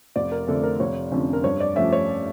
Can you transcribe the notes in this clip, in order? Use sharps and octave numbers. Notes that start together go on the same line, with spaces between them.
F1 D5
A#4
F2 D3 A3 D4 A4
A#4
F1 C#5
F2 D3 F3 C#4
A#4
G2 C#5
D5
F3 A3 C#4 E5
C#5